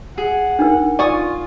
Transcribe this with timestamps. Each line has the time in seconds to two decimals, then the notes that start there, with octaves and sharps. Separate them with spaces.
0.18 G#4 F#5
0.59 D4 D#4 A#4
0.99 F4 D5 G#5 C#6 D#6